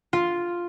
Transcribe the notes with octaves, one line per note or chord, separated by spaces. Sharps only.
F4